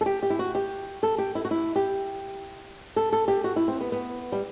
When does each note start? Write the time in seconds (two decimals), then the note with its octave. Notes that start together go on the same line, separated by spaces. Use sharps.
0.01 A4
0.06 G4
0.23 G4
0.30 E4
0.39 F#4
0.55 G4
1.03 A4
1.18 G4
1.35 E4
1.45 F#4
1.51 E4
1.76 G4
2.96 A4
3.12 A4
3.28 G4
3.44 F#4
3.56 E4
3.68 C4
3.81 B3
3.92 B3
4.32 G3